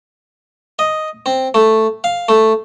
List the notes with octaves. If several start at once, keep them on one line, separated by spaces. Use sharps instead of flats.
D#5
C4
A3
F5
A3